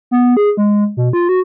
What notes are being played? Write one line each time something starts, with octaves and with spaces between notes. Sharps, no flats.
B3
G#4
G#3
B2
F4
F#4